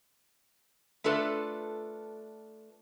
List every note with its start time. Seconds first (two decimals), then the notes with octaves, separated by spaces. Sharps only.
1.04 A3 D4 F4 A4 B4